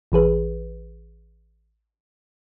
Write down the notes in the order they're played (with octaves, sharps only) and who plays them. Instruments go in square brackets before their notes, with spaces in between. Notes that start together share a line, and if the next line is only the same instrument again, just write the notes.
[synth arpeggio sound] A1 E3 G#4 B4